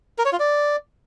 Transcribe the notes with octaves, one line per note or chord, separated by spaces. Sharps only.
A#4
C#5
F4
D5